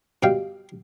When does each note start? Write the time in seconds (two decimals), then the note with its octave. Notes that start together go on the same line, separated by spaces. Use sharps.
0.23 G2 B2 F5 G5